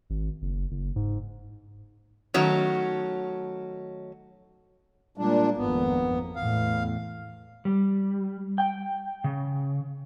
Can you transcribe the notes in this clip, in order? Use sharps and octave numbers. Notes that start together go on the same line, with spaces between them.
G#1
F#1
F#1
G#2
D#3 F#3 A3 C#4
A#2 G3 G#3 A#3 D4
G#1 F2 A#3 B3
E2 A2 F5
G3
G5
C#3